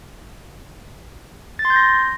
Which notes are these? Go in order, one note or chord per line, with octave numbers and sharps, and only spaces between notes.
A6
C6
G6
A#6